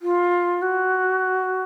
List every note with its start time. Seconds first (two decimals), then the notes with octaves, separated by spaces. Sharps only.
0.02 F4
0.62 F#4